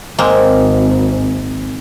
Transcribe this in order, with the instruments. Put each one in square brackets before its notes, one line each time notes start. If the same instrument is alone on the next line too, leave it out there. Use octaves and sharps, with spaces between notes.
[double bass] G#1 [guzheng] G#3 A#3 C4